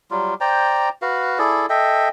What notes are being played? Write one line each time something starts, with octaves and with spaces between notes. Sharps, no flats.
F#3 G3 F4
C5 D5 G5 A#5
F#4 B4 F5
E4 G#4 A4 D5
A4 D#5 E5 G5